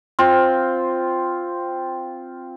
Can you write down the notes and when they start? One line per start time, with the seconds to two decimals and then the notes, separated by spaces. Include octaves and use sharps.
0.19 C4 F4